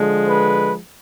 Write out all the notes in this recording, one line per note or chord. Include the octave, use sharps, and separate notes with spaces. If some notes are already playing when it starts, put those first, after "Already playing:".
Already playing: D3 F3 G#3
B4